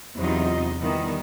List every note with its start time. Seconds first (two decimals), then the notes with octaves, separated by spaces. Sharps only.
0.17 E2 C3 F#3 D#4 F4 D#5
0.80 D#3 E3 G3 B3